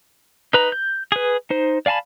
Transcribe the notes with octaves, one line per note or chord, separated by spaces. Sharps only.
D#4 B4 A#5
G6
G#4 B4
D#4 C5
D5 F5 G#5 A5 B5